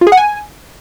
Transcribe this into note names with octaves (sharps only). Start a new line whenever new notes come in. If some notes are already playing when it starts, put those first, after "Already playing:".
F4
G#4
F#5
G#5